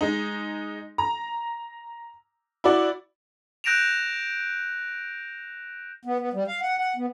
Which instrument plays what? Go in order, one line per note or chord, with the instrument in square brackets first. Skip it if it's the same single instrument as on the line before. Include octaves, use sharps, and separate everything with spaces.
[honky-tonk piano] G#3 D#4
A#5
E4 F#4 D5
[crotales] F#6 G6 A#6 D7 E7 F7
[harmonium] B3
B3
G3
F5
F#5
F#5
B3